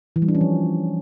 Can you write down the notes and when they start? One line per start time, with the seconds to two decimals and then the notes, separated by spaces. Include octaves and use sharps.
0.16 E3
0.22 G3
0.28 D4
0.35 C#4
0.41 F3